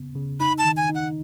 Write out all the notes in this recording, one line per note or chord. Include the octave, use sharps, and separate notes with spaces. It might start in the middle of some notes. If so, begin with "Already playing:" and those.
Already playing: C#3 B3
C#3
D#4 B5
A5
D#3
G#5
D#4
F#5